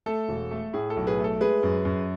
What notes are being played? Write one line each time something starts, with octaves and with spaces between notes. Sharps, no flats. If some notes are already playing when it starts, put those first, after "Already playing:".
A3 A4
E1
A3
A2 G#4
A4
B1
G#4 B4
A3
A4
G#3 G#4 B4
F#2
F#2